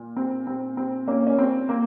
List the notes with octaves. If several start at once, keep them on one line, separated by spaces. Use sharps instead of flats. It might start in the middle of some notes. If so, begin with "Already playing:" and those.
Already playing: A#2
C4
C4
C4
A#3 C#4
C#4
C4
A#3